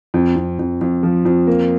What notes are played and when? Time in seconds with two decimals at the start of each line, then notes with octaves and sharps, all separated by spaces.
0.14 F2
0.36 F2
0.59 F2
0.81 F2
1.03 F3
1.25 F2
1.47 A#3